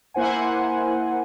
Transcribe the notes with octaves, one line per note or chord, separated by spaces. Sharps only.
A#3 E4 C5 F#5 G#5